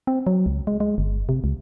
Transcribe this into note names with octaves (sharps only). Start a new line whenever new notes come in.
C4
F#3
C#2
G#3
G#3
G1
C3
C#2